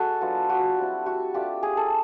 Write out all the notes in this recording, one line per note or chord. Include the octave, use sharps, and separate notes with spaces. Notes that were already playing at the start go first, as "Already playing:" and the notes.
Already playing: G#3 F#4 A4
F#3 B3 D4 F4
F#4
G3 C4 E4
F#4
A3 D4 F4 G4
G#4
A4